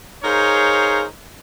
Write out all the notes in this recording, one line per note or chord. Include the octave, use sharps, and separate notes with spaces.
D#4 G#4 A#4 C5 C#5 F5